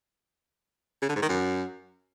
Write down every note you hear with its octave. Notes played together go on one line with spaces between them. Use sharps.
C#3
D3
G#2
D#3
F#2